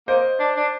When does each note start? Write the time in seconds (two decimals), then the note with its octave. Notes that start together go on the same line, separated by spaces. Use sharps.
0.08 A#3 C5 D#5
0.40 D4
0.56 D4